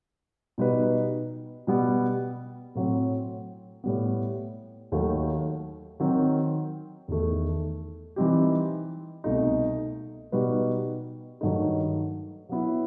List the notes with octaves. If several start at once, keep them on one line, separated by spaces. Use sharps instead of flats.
B2 G3 D#4 F#4 B4
B2 G3 B3
A2 F#3 C4
A2 G3 B3
D#2 D#3 F#3 A3
D#3 F#3 C4
E2 D#3 A3
E3 G3 C4 D#4 G4
C2 B2 A3 D#4
B2 G3 D#4 F#4 B4
G2 D#3 F#3 A3 D#4
F#3 B3 E4